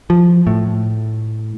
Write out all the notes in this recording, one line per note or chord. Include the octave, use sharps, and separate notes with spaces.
F3
A2